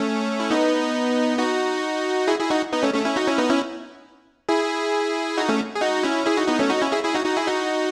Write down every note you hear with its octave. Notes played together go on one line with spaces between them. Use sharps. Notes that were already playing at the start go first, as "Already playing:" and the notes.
Already playing: A3 C#4
E4
B3 D#4
D#4 F#4
E4 G#4
E4 G#4
D#4 F#4
B3 D#4
A3 C#4
A3 C#4
C#4 E4
D#4 F#4
C#4 E4
B3 D#4
C#4 E4
E4 G#4
D#4 F#4
A3 C#4
G#4
D#4 F#4
C#4 E4
E4 G#4
D#4 F#4
B3 D#4
A3 C#4
D#4 F#4
C#4 E4
E4 G#4
E4 G#4
D#4 F#4
D#4 F#4
E4 G#4
D#4 F#4